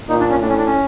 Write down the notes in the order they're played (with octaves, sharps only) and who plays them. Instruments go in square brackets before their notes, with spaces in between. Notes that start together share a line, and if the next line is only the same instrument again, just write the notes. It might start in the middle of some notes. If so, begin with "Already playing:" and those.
[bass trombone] A#2 [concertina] D#4
[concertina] D4
C#4
[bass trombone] A2 [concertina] D4
[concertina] C#4
D4
C#4